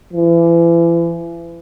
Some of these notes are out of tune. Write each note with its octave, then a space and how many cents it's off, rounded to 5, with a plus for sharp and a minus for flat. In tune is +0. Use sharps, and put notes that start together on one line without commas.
E3 +35